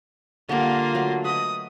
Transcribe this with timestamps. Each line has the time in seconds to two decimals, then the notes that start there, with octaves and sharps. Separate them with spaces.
0.49 D3 G3 A#3 F4
0.95 F#3 A3
1.25 B4 D#5 D#6